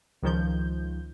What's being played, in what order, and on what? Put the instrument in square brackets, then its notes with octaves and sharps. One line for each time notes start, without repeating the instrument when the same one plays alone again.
[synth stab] C#2 D#3 F3 G6